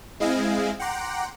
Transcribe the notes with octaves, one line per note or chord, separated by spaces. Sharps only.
G#3 C4 E4 D#5 F5 G#5
F#5 G5 A#5 C6 D6